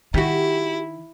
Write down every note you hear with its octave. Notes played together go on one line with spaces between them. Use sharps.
D#3 E4 F#4 G4